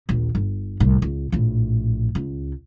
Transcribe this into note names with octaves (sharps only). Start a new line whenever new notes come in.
A#1 D#2
G1
C2 A2
C#2
A#1 A2
C#2